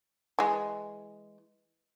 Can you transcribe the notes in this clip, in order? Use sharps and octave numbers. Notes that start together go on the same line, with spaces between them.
E3 G#3